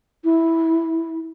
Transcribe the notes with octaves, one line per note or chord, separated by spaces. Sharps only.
E4